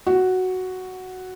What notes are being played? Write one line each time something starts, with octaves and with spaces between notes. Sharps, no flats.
F#4